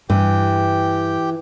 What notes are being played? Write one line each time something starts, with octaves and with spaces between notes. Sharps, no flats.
G2 E3 G4 G5